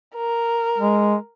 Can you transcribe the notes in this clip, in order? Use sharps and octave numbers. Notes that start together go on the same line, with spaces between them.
A#4
G#3